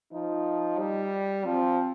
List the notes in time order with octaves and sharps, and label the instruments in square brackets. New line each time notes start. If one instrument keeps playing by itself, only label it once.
[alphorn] F3 [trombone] D#4
[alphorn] G3
[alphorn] F3 [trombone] C4